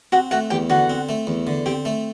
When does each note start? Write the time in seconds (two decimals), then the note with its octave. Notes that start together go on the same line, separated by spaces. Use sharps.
0.12 C4 F#4 F#5
0.31 A3 F#4 F#5
0.50 E2 G4 G5
0.70 D3 F#4 F#5
0.90 C4
1.09 A3
1.27 E2
1.47 D3
1.66 C4 G4 G5
1.85 A3